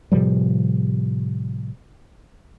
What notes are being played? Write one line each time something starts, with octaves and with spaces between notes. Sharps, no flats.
A2 C3 F3 G3